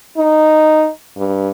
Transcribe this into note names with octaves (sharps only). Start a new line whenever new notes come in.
D#4
G2